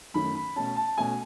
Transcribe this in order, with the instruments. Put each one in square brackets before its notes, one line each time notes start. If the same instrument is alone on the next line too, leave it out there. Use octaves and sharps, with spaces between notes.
[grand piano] F#2 D#3 A3 C#4 B5
B5
B2 A3 C#4 A5
A5
B2 A3 C#4 G#5